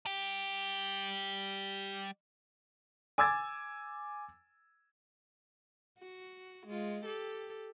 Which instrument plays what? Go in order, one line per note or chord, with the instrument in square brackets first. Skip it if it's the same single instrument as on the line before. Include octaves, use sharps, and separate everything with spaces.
[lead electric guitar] G3 G4
[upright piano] G#5 D6 E6 G#6 A6
[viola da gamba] F#4
G#3 F4
G4 A4